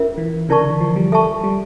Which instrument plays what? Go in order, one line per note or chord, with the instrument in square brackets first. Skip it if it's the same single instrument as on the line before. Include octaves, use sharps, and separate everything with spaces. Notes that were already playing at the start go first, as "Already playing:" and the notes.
Already playing: [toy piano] C#4 F4 A#4 E5
[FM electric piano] E3
[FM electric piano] C#3 [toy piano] E4 A#4 D5 A5 C#6
[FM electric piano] D3
E3
F3
G3
[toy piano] A4 E5 A5 C#6
[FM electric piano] G3